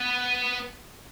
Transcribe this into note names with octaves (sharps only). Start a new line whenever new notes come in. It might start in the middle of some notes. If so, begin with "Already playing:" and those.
Already playing: B3